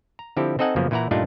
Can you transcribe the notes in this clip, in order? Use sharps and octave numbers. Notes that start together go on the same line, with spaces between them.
A#5
D3 F3 C4 E4 G4 A4
C4 D#4 A4 D#5 F#5 G#5
F#2 C#3 F3 A#3 B3
A#2 E3 E4 F#5 A#5
G2 A#2 A3 D4 D#4 F4